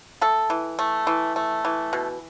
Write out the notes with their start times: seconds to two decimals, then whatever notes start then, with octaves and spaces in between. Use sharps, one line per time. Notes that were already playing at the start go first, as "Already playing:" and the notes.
0.21 A3 A4
0.50 E3
0.79 A3
1.07 E3
1.36 A3
1.65 E3
1.93 B2